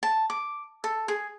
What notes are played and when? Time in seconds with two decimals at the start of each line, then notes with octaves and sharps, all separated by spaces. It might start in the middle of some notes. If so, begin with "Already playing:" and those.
0.03 A5
0.30 D6
0.84 A4
1.08 G#4